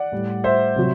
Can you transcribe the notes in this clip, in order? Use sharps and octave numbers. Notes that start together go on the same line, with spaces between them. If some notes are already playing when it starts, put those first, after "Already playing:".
Already playing: D5 F#5
A2 G3
C5 E5
C3 F#3